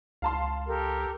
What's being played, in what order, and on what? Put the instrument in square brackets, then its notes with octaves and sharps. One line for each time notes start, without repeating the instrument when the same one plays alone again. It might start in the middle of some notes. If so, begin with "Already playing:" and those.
[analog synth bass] C#2 [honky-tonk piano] F5 A5 C6
[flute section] G4 A4 A#4